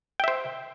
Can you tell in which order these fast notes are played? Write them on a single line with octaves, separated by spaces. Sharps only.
G5 E5 C5